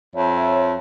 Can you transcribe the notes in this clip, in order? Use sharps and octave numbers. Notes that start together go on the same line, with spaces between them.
F2 C#5 E5